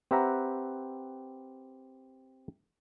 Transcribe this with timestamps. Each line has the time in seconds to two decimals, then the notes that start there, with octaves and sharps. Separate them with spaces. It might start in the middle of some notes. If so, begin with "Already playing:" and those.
0.11 C4 G4 B4 E5 F#5 A#5